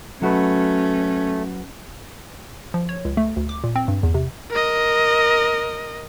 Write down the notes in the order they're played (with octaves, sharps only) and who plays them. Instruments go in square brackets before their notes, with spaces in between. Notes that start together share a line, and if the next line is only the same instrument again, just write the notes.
[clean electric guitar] F#3 F#4 B4 [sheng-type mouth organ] A3 [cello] C#4
[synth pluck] F3
C#5
C#2
A3
D2
D6
A#2
C4
G2
E2
C3
[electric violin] A#4 D#5